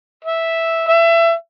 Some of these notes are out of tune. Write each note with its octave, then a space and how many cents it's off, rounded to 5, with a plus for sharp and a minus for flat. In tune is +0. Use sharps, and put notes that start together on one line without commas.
E5 -5
E5 +25